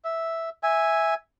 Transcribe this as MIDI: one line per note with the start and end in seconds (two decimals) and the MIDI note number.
0.04 0.49 76
0.63 1.14 76
0.63 1.14 80